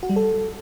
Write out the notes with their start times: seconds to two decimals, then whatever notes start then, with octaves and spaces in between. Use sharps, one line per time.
0.03 F#4
0.10 G3
0.16 A4